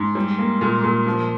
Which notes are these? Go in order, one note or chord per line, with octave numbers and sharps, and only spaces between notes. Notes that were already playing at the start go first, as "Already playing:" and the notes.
Already playing: G#2
G3
A#3
A#2
A#2
F3